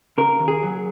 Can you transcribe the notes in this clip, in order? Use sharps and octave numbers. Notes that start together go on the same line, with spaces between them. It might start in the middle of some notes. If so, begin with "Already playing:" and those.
C#3 A#4
D#2
G#4
F#3